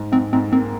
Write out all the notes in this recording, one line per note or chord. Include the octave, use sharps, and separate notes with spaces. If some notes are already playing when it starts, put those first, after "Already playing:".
Already playing: G#2
G#2 C4
G#2 C4
A#3 C4